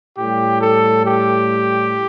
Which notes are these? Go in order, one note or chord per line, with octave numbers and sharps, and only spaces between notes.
A2 G3 G4
A4
G4